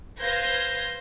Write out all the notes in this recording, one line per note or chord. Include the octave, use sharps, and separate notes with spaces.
B4 C5 F5 G6 G#6 A#6